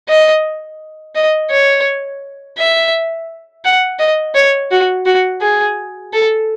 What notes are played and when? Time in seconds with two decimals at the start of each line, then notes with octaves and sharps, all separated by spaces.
0.09 D#5
1.15 D#5
1.51 C#5
2.58 E5
3.64 F#5
3.99 D#5
4.35 C#5
4.71 F#4
5.06 F#4
5.42 G#4
6.13 A4